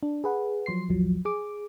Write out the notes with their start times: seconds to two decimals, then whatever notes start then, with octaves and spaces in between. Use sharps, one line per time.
0.03 D4
0.24 G#4 B4 F#5
0.66 F3 F#3 C6 C7
0.88 A1 D#2 F3 F#3
1.25 G#4 D6